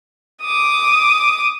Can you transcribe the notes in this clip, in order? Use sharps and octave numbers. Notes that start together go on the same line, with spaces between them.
D6 D#6